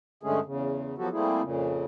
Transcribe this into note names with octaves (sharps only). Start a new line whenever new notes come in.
G2 D3 G#3 A3 C#4 G#4
E2 C#3
F3 F#3 B3 F#4 G4 A4
G3 A3 A#3 C4 E4 G#4
F2 A#2 C#3